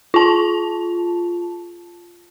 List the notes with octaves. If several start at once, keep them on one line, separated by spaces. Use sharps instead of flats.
F4 A5